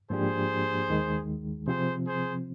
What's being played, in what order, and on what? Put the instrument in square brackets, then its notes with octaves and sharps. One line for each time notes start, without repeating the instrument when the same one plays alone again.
[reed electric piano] G#2 F3 A#3 D4 G4 [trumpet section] G#4 C5
[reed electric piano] D#2 D#3 G#3
[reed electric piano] C3 F3 C4 [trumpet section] G#4 C5
[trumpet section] G#4 C5